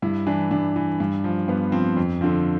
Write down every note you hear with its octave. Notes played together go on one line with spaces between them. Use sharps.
G2 E4
E3 D4
G2 D4
E3
G2
F3
G2 B3
F3 C4
F2
D3 F3 C4